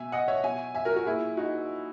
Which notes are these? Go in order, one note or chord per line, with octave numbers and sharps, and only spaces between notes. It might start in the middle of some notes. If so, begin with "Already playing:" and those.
Already playing: B2 E5 G#5
D#5 F#5
C#5 E5
B2 E5 G#5
E5 G#5
F#4 A#4
F#4 A#4
A#2 E4 G#4
D#4 F#4